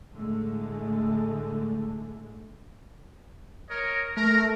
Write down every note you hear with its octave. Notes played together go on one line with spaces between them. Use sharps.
A2 D3 G#3 A3
A#4 C#5 D#5
A3 A#4